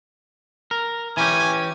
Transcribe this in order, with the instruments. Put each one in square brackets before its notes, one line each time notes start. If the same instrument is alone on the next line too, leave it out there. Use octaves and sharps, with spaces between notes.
[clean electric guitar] A#4
[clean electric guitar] E3 C#4 G4 [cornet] G#5